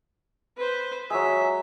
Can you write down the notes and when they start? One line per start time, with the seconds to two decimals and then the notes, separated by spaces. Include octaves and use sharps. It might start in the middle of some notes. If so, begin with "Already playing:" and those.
0.57 B4 C5
1.10 F#3 G#3 E5